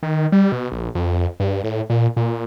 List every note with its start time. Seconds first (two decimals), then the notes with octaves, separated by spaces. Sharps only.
0.03 D#3
0.32 G3
0.52 B2
0.71 A#1
0.95 F2
1.40 G2
1.64 A2
1.90 A#2
2.17 A#2